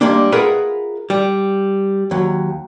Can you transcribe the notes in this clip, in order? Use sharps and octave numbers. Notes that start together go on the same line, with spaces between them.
G3 G#3 A#3 D4
F4 G#4 A#4 B4 E5 F#5
G3
D#2 F#3